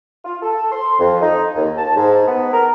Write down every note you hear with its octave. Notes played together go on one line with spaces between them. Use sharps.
F4
A4
C6
F2
D#4
D#2
A5
G#2
B3
A#4